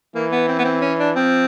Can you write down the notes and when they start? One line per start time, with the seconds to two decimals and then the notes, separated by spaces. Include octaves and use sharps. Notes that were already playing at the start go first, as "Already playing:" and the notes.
0.15 E3 A#3
0.32 B3
0.48 C4
0.59 B3
0.65 C4
0.81 C#4
0.99 D4
1.15 F3 C4